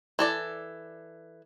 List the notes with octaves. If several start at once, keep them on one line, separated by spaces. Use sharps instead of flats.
E3 A4 D5